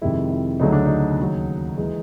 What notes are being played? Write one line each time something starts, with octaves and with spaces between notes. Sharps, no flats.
F2 C3 D#3 G#3 E4
E4
D2 C#3 F#3 A3 D#4
D4
D#4
D#2 C#3 F#3
E3 G#3